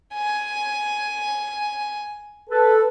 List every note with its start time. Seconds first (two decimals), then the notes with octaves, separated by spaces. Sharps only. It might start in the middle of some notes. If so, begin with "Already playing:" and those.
0.14 G#5
2.50 A4 B4